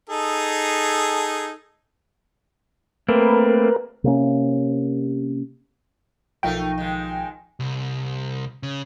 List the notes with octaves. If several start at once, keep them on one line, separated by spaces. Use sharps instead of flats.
D#4 G#4 A4
A3 A#3 C4 A#4 B4
C3 A#3 C#4
B1 F3 A3 D#4 A#4 F5 G5
D#3 G#3
C2
C#3